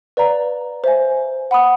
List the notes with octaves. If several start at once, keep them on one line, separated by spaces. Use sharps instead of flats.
B4 D5 F5 A#5
C5 E5 G#5
F#5 B5 D#6